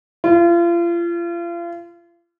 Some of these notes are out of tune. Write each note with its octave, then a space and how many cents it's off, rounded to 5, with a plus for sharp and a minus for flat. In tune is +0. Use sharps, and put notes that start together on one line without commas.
F4 -35